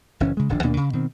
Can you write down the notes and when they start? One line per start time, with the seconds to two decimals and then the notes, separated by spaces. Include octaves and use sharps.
0.20 F#1 E3 C#4
0.37 C#3 G#3
0.49 D1 G#1 F3 D4
0.63 D#2 B2 A#3 D4
0.77 C#3
0.93 B2 D#3 C4